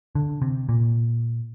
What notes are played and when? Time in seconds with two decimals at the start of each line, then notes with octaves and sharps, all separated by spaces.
0.15 D3
0.42 C3
0.69 A#2